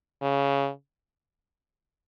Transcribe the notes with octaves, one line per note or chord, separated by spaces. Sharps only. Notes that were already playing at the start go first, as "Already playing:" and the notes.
C#3